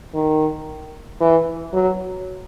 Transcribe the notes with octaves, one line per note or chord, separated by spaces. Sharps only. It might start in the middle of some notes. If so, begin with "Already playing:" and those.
D#3
E3
F#3